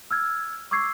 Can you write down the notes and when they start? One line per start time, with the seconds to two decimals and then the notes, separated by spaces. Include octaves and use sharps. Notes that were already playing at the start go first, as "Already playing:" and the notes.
0.11 E6 F6 G#6
0.71 C#6 D6 E6 G#6 C7